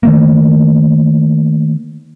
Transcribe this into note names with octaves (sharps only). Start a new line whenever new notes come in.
D#3 A3 A#3